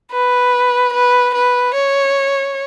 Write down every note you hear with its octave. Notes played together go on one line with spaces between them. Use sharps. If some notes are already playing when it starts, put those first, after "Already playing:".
B4
B4
B4
C#5